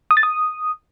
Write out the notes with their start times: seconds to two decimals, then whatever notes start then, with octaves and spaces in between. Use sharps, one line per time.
0.11 D#6
0.17 A6
0.23 D#6